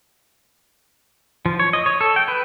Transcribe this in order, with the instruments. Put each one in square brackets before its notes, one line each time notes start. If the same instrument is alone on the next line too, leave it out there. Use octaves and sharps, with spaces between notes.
[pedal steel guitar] F3
C#5
D#5
C#5
A4
G5
B4